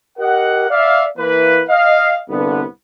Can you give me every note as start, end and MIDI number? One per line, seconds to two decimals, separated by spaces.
0.19 0.64 67
0.19 0.64 70
0.19 0.64 75
0.19 0.64 78
0.70 1.04 74
0.70 1.04 76
0.70 1.04 77
1.18 1.61 52
1.18 1.61 58
1.18 1.61 71
1.69 2.15 75
1.69 2.15 77
2.29 2.63 36
2.29 2.63 43
2.29 2.63 50
2.29 2.63 59